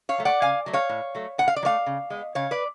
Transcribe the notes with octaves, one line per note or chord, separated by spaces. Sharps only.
C#5 F5
F#3 A3
D5 F#5
C#3 F5 G#5
F#3 A3
C#5 F5
A2
F#3 A3
A2 F#5
F5
D5
F#3 A3 C#5 F5
C#3
G#3 B3
C#3 C#5 F5
B4 D5